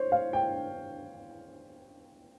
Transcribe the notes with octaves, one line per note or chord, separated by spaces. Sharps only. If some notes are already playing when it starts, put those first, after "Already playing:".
Already playing: C5 C#5
F5
G5